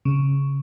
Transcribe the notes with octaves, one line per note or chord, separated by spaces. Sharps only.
C#3